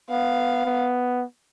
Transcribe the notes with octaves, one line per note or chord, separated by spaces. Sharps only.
B3 F5
B3